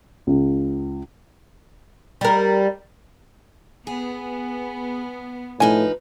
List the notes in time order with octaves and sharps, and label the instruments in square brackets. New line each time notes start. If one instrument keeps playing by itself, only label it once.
[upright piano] C#2
[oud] G3 A#4
[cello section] B3 [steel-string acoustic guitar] G#4
[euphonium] A2 [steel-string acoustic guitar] F3 D#4 B4 [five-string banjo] G#5